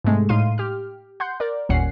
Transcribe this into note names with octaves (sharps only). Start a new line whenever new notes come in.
G#2 C3 G#3 A3
A2 D#4 F5 C6 D#7
G4 F6
F#5 C6 G6
A#4 D5
G1 D#2 A#2 C#4 F#5 C7